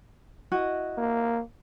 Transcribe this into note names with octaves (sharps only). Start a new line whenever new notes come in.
E4 F#4 D#5
A#3